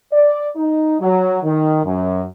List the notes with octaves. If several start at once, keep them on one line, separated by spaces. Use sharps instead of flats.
D5
D#4
F#3
D#3
F#2